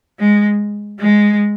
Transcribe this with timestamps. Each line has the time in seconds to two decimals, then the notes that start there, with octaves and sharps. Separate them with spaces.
0.19 G#3
1.00 G#3